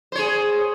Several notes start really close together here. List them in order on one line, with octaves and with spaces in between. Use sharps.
C5 C#5 G#4